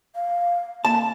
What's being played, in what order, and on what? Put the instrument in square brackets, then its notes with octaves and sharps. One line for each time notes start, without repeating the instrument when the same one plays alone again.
[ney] F5
[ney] A#3 [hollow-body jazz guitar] A5